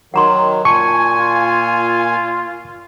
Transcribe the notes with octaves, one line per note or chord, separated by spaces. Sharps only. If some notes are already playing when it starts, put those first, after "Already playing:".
D#3 F#3 F#5 A#5 C6
A#2 G#5 A5 C#6
F4